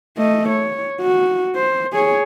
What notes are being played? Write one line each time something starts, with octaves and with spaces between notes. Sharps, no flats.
A3 D#5
C#5
F#4
C5
G#4 C#5